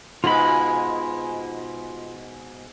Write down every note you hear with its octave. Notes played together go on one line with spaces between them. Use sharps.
G#2 B2 G#3 F4 B5